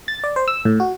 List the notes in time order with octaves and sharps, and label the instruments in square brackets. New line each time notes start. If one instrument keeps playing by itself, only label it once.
[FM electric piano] A6
D5
C5
E6
A2
F#4